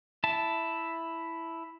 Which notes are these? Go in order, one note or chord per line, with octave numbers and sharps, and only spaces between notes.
E4 E5 A5